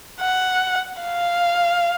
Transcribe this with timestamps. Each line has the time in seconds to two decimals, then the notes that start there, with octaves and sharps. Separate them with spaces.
0.20 F#5
1.02 F5